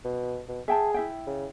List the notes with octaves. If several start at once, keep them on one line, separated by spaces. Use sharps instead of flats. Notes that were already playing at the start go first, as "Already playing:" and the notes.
B2
B2
G#4 E5 G5 A5
E4 E5 G5
C#3